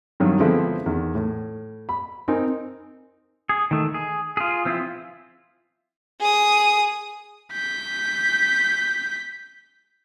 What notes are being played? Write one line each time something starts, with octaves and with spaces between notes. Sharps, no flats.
G2 D#3 F#3
D3 F3 G#3 B3 C4 E4
E2 D#3
A2
B5
C4 D#4 A#4 G#5
G#4
D#3 A3
G#4
F4 G#4
F3 C4 E4 F4
G#4 D#6
G6 B6